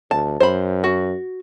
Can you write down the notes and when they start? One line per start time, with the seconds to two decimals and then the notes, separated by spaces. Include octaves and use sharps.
0.11 D2 A5
0.40 F#2 C5 B5
0.84 F#4